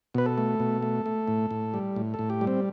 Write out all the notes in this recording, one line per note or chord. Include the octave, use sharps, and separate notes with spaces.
B2 B4
A4
A3
B2
A3
A3
A2
A2
G3
A2
A4
A2
G4
G3
C4